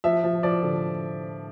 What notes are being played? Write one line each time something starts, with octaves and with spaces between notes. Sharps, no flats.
F3 E5
F3
F3 D5
D3